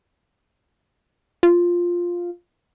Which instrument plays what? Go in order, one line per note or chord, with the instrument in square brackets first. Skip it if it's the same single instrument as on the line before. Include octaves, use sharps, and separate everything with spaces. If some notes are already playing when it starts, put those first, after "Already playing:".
[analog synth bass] F4